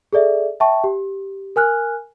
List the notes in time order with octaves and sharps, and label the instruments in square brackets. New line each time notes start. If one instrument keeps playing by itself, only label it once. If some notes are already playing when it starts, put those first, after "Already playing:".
[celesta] G#4 A4 D5 E5
E5 G5 A5 C#6
G4
A#4 G#5 F6 F#6